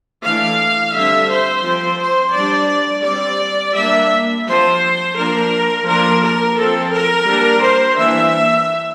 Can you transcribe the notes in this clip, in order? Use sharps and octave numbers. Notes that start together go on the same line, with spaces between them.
E3 A3 D4 F5
D3 G3 C4 E5
C5
F3 C4
C5
G3 D4 D5
G3 C4 D5
G3 A#3 D4 E5
F3 C4 C5
F3 A#3 D4 A#4
F3 A#3 D4 A#4
A#4
F3 C4 A4
A#4
G3 A#3 D4
C5
E3 A#3 D4 E5